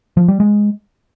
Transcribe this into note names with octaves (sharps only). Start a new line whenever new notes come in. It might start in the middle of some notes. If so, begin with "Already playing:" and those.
F3
G3
G#3